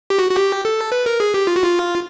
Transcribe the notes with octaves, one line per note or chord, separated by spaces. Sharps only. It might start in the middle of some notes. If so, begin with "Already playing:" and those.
G4
F#4
F#4
G4
A4
B4
A#4
G#4
G4
F4
F#4
F4